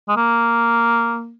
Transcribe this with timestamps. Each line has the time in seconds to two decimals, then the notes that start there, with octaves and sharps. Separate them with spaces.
0.09 G#3
0.16 A#3